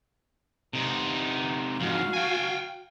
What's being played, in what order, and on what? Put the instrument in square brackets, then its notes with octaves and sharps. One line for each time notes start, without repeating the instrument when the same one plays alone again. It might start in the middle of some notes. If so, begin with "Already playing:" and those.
[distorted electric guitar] C3 D#4
[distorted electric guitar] F2 G#2 [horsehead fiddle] F#4 F5
[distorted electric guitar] G5 G#5